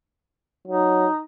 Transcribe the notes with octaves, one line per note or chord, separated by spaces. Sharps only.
F#3 D#4